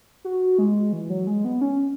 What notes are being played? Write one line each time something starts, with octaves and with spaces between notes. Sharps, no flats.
F#4
G#3
E3
F#3
G#3
B3
C#4